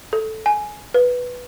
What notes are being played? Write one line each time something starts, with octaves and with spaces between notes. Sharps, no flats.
A4
G#5
B4